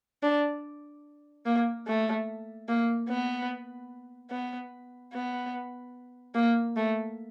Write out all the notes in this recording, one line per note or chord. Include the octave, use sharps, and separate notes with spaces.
D4
A#3
A3
A#3
B3
B3
B3
A#3
A3